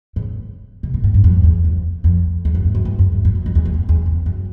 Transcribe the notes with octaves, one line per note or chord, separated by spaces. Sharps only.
A2
B2
A#2
G#2
G2
F2
E2
F2
F2
E2
F#2
G2
F#2
G#2
F#2
G2
F#2
F#2
F2
E2
F2
E2
E2
F2
F#2